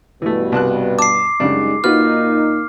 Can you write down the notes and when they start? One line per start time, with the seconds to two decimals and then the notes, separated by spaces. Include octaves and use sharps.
0.22 G2 B2 E3 A3
0.52 C2 A5 F#6
0.99 A5 D6 C7
1.40 F#2 C#3 G3 G#3 D4 D#4
1.84 A#2 A#3 D#4 F4 F#4 B4 F6